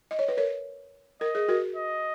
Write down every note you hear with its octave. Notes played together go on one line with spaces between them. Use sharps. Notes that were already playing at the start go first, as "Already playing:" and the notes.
D#5
C#5
B4
A#4 C#5
A#4 D#5
G#4
F#4 A#4
D#5